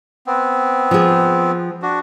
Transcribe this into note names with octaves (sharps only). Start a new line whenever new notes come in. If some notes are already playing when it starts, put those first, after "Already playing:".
B3 C4
F3 G#4
D4 F#4